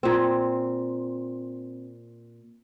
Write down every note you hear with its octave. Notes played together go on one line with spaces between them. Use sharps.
A#2 C4